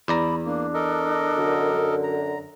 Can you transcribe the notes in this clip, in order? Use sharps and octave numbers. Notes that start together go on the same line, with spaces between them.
E2 D5 A#5 B5
A#3 D4
A4 A#4 D#5
F#2 D3
A#5